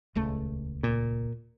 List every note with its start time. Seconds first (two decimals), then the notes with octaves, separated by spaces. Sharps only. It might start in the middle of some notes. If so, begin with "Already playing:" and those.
0.15 D#1 C#2 A3
0.83 A#2